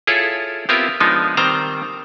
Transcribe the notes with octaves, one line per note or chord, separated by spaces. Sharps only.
E4 F4 G#4 A4 C#5
B3 C4 E4 F4 G4 A#4
F3 G#3 B3 D4 D#4
D#3 G3 C4 C5 A#5